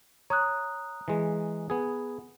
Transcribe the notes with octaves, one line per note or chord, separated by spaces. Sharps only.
C#5 A#5 D#6 F#6
E3 G#3
B3 G#4